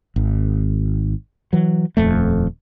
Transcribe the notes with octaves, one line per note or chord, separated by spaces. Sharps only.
G#1
E3 F#3
D#1 F2 A3